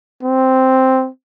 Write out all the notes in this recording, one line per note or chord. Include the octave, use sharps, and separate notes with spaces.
C4